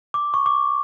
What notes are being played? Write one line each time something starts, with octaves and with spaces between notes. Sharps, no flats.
D6
C#6
D6